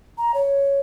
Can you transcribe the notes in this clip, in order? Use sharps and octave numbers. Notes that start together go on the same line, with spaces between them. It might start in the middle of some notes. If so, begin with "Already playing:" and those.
A#5
C#5